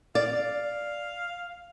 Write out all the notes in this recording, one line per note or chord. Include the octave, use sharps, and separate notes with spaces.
D5 F5